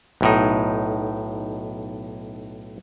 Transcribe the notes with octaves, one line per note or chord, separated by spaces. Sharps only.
B1 A2 D#4